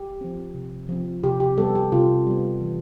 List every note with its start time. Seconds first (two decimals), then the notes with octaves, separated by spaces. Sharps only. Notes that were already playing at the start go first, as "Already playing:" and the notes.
Already playing: G4
0.21 F3 C4
0.54 C3
0.89 F3 C4
1.24 C3 G4
1.40 G4
1.57 G3 B3 A4
1.75 G4
1.92 C3 F4
2.27 G3 B3
2.61 E3